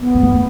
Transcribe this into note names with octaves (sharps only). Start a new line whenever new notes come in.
B3
G#2
G2